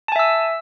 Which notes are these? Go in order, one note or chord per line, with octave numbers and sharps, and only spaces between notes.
E5 G#5 A5 E6